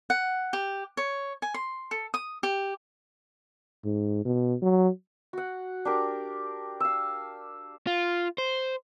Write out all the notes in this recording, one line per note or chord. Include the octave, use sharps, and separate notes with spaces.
F#5
G4
C#5
G#5
C6
A4
D#6
G4
G#2
B2
F#3
F#4 F#5
D4 G4 A#4
F5 E6
F4
C5